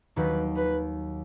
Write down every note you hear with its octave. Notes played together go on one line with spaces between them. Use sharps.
D#2 D#3 F#3 B4
B4